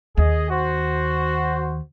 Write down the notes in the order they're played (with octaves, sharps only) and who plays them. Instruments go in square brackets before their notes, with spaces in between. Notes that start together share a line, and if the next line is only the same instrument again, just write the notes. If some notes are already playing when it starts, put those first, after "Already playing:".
[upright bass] D#2 [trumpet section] G#4 D#5
[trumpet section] F#4 C5